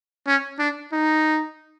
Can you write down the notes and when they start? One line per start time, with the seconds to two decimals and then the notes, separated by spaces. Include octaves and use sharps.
0.27 C#4
0.59 D4
0.92 D#4